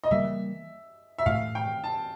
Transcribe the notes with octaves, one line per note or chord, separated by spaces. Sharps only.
D#5
C#3 E3 G3 A#3 E5
E5
A2 E3 A3 F5
G5
A5